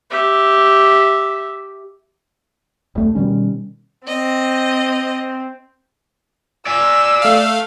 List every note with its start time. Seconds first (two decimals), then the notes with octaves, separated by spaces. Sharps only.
0.10 G4 E5
2.95 D#1 C2 A3
3.15 B2 D#3 G3 C#4
4.07 C4 D#5
6.66 D5 G#5 E6
7.22 A3 F5